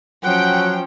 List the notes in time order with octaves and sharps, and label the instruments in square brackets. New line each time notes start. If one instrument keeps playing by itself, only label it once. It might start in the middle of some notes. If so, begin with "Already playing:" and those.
[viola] F3 C#4 [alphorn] F#3 [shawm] F#5 [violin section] G5